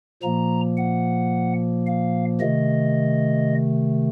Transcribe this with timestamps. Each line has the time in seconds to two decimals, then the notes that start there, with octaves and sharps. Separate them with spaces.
0.23 A#2 F3 A#3 A#5
0.77 F#5
1.86 F5
2.40 C3 D#3 A3 D#5